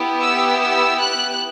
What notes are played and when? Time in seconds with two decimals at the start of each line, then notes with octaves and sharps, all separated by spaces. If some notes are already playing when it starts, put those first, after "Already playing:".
Already playing: B3 E4 G4
0.22 E6
0.61 E6
1.01 F#6